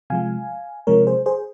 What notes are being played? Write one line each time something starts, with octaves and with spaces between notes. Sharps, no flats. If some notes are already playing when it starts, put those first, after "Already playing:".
C3 F3 G#3 F5 G#5
C3 F3 G#3 A#4 C#5
G#4 C5
G#4 C5